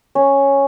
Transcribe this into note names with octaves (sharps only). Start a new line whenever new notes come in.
C#4